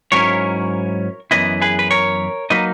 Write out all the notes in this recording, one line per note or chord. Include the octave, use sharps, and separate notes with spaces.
G#2 F#3 C#4 E4 A#4 C#5
F#2 E3 B3 E4 B4 D#5
G#4 B4
B4
A#4 C#5
F#3 A#3 D#4 B4 D#5